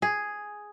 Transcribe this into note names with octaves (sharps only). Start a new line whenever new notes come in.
G#4